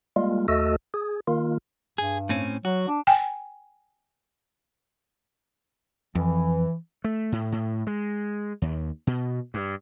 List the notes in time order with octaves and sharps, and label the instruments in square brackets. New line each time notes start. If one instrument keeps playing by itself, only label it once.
[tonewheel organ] G3 G#3 A#3 F4
D#2 A3 F#4 A4 D#5 E6
G#4
D#3 A#3 F4
[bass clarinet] G2 [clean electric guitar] G#4
[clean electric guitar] A2 C4 C#4
[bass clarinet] F#3 [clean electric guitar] F#4
[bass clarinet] D4
[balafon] G5 G#5
[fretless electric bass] F2 [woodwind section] E3
[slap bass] A3
A2
A2
G#3
D#2
B2
G2